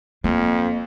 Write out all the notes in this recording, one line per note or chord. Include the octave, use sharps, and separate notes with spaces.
F2 A#3